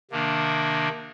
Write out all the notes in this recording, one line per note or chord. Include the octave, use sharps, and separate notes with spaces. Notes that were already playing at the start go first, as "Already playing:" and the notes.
C3 D#3 A#3 D4